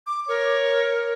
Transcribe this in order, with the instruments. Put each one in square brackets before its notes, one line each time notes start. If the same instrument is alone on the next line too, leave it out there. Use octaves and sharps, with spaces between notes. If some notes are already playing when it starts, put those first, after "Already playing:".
[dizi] D6
[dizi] A#4 [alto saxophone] C#5